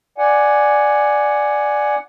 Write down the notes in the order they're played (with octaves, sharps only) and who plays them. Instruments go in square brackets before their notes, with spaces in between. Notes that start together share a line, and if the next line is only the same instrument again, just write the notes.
[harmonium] D5 F#5 G#5